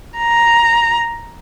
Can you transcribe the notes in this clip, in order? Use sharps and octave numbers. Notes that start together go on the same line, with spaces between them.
A#5